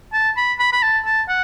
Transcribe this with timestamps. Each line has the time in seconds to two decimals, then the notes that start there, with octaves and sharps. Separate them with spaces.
0.13 A5
0.37 B5
0.59 B5
0.72 B5
0.83 A5
1.05 A5
1.29 F#5